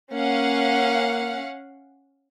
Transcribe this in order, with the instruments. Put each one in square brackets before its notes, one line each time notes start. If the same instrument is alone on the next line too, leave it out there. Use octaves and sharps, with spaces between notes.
[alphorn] A#3 [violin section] C#4 F5 F#5